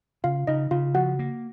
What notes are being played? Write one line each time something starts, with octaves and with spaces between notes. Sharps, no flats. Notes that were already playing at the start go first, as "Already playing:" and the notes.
C#3 F4 F5
C#3 D#4 D#5
C#3 F4 F5
F3 F#4 F#5
A#3